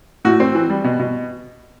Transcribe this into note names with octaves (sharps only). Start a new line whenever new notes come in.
A2 F#4
C4
E3
G3
B2
B2